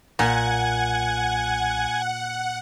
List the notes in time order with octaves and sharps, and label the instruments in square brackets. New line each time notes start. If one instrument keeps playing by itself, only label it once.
[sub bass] B1 [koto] A#2 [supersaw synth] F#5 [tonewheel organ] G#5